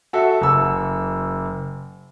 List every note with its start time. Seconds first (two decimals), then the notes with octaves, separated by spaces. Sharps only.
0.13 F#4 A4 E5
0.41 F#1 E6